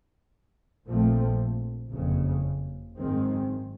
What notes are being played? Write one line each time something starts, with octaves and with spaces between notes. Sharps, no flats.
A#1 A#2 F3 A3 C4
F#1 F2 C#3
G#1 F#2 D#3 G#3 C4